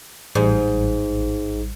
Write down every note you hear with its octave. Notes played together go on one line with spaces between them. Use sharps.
A1 G#2 G3